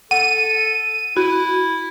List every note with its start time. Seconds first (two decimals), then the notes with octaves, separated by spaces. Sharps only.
0.11 A4 F#5 D#7
1.17 E4 F#4